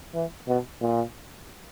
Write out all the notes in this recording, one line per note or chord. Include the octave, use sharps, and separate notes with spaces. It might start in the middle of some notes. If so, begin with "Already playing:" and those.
E3
B2
A#2